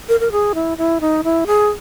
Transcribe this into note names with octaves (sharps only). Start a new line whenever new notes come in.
A#4
A#4
G#4
E4
E4
D#4
E4
G#4